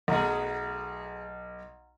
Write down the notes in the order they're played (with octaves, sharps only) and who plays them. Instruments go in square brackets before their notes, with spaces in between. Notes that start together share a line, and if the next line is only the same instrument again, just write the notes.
[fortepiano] B1 [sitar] A3 B3 G#4 [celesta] F#5 A#5